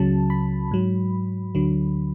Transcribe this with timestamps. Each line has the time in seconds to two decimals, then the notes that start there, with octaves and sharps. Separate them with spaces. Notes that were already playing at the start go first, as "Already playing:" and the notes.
Already playing: C#2 C#3 F#3 A5
0.30 B5
0.71 G#2 F#3
1.55 D2 D3 F#3